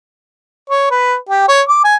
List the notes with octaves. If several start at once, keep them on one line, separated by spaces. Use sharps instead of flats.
C#5
B4
G4
C#5
D6
G#5